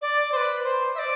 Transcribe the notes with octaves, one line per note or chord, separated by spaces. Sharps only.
D5
C5
B4
C5
E5
D5